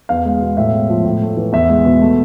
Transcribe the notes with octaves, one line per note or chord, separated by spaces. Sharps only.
E2 F5
G#3
B2
A2 E5
G#3
F3
A2
A3
E3
E2 E5
G#3
B2
A3